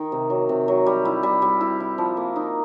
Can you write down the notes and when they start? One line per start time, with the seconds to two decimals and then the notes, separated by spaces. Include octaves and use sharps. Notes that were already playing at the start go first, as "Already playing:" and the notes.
Already playing: D#3
0.12 C3
0.30 F#3
0.49 C3
0.68 F#3
0.86 G3
1.05 E4
1.23 G3
1.42 G3
1.61 E4
1.80 E4
1.98 F3
2.17 A#3
2.36 D#4